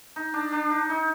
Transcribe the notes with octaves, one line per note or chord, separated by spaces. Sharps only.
D#4
D4
D4
D#4
D#4